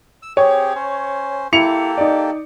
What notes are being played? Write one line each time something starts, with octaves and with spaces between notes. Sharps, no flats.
E6
C4 G4 G#4 C#5
C#4 C5
A#3 E4 G4 A4 C#7 F7
D#4 D5